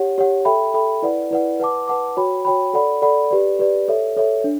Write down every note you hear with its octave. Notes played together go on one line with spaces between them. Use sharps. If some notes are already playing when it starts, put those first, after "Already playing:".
Already playing: G4 C#5 F#5
G4 C#5 F#5
A4 E5 G5 B5
A4 E5 G5 B5
E4 B4 D5 F#5
E4 B4 D5 F#5
B4 F#5 A5 D6
B4 F#5 A5 D6
F#4 C#5 G5 B5
F#4 C#5 G5 B5
A4 D5 F#5 B5
A4 D5 F#5 B5
G4 B4 D5
G4 B4 D5
A4 C#5 E5
A4 C#5 E5
D4